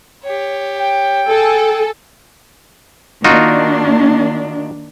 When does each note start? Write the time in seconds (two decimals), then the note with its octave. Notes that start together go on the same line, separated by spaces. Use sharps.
0.23 G4 C#5
0.79 G5
1.28 G#4 A4 G#5
3.24 D#3 A#3 D4 D#4 F4 F#4